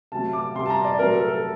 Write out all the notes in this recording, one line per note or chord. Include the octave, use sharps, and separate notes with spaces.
C3 F#3 A3 A5
D6
C3 G3 C6
A5
A#5
D5
C3 F#3 A3 A#4
A4
A4